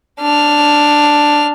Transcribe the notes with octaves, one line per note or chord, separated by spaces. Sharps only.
D4 F6